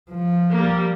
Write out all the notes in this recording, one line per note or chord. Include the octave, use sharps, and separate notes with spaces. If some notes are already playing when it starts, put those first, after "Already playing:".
F3
G3 A#3